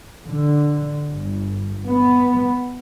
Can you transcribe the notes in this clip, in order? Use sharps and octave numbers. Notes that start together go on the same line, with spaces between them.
D3
G1
B3